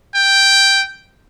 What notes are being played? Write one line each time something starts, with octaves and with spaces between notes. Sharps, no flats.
G5